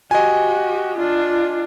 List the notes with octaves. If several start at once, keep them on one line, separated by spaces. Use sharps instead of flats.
F#4 G4 D#5 G#5
D4 F4